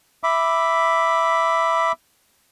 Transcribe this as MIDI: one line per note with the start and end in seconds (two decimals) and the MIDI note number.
0.24 1.92 76
0.24 1.92 83
0.24 1.92 86